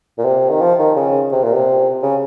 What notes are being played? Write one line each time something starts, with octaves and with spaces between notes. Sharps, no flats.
A#2
C3
D#3
F3
D#3
C#3
C3
A#2
C3
C#3